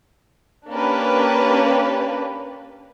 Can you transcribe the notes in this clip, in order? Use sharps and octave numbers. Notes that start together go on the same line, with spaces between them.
A#3 C#4 D4 G4 B4